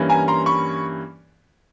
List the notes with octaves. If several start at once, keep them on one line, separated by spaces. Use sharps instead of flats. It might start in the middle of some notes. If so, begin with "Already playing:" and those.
Already playing: G2 E3 G3 A#3 C#4
G#5 A#5
A#5 C6
B5 C#6